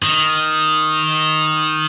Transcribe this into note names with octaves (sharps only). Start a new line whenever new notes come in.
D#3